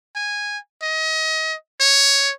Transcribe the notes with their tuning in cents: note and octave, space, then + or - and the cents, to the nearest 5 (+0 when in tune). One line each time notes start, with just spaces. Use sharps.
G#5 -10
D#5 +30
C#5 +5